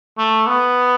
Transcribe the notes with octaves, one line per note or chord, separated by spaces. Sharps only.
A3
B3